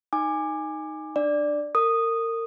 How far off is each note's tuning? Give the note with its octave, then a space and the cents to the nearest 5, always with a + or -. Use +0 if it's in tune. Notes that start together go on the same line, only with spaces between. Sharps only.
D#4 +0 G#5 -10 D6 +20
D4 +20 D5 +0
A#4 -35 D#6 -10